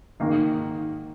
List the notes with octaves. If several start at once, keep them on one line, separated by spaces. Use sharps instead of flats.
G#2 D#3 A#3 D#4